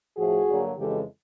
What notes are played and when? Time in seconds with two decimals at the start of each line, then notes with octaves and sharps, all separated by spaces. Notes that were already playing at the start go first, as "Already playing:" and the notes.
0.17 A2 F3 A3 F#4 G#4
0.47 G2 D3 F#3 A#3
0.78 F2 C#3 E3 G#3 G4 A4